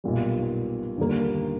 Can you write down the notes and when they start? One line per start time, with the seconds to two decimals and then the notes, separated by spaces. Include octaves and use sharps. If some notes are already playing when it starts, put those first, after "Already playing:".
0.04 B1 A#2 G3
0.97 D#2 D3 G3 A#3